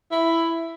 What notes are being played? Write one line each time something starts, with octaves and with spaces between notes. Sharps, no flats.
E4